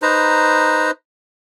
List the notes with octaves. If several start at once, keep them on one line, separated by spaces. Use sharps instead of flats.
D#4 B4 C5 A#5